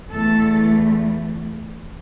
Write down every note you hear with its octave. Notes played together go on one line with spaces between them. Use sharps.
E2 E3 A3 A4